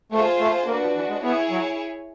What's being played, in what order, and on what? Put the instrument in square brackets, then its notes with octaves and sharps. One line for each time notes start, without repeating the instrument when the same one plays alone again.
[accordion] A3 [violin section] F4 G#4 C5
[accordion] A3
[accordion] A#3 [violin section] D4 F#4 B4
[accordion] F3
E3
G#3
[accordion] B3 [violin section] E4 G#4 C#5
[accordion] F#3